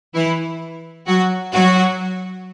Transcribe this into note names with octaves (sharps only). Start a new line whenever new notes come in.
E3 E4
F#3 F#4
F#3 F#4